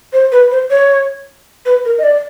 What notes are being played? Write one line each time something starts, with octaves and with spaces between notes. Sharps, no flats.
C5
B4
C5
C#5
B4
A#4
D#5
D5